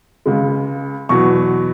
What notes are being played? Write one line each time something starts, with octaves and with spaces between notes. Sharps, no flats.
C#2 C#3 G#3
E2 B2 F#3 C#6